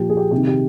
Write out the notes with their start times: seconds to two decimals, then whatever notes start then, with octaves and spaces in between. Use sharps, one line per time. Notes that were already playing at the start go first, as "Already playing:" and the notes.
Already playing: A#2 F3 G4
0.10 G#4
0.17 G4
0.31 C3 G4
0.37 D#3
0.47 G4